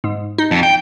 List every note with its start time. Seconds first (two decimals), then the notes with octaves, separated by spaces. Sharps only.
0.04 G#2
0.38 D#4
0.51 F2
0.63 G5